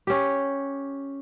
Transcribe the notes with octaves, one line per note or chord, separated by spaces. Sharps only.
C#4 G4